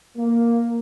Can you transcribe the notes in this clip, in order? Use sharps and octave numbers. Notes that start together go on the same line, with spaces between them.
A#3